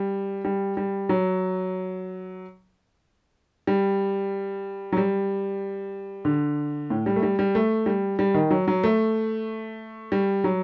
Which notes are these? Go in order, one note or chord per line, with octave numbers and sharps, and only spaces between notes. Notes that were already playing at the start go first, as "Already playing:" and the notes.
Already playing: G3
G3
G3
F#3
G3
F#3
G3
D3
A2
G3
A3
G3
G3
A3
G3
G3
D#3
F#3
F#3
A3
G3
F#3